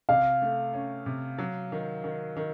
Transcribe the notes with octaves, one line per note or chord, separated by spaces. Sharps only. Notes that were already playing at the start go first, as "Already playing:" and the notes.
C3 F5
A3
C#4
C3
F#3
D#3
D#3
D#3